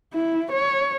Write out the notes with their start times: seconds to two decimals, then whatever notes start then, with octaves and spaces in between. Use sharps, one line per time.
0.14 E4
0.52 C#5